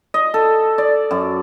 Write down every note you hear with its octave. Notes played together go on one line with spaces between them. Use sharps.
D#5
A4
D5
F#2